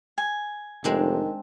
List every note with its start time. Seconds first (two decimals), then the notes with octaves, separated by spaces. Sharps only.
0.18 G#5
0.84 F1 D#3 G#3 C4 D4